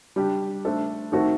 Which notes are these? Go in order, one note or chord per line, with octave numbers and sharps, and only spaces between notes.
G3 D4 G4
A3 D4 A4 C5
D#3 A3 C4 F#4 A4